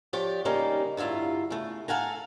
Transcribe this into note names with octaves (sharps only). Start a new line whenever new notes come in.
F3 G4 C#5 D5
C#3 G3 A#3 C#4 D#4
D2 G2 E4 F4 A#5
C#3 A3
A4 F5 F#5 G#5 A#5